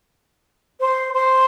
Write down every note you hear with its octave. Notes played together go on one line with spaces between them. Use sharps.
C5
C5